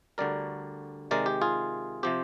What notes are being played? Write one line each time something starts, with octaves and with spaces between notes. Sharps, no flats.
D2 D3 G3 A#4 D5
C3 D#3 G#3 A#4 D5
G4
F4 G#4
C3 F3 C4 G4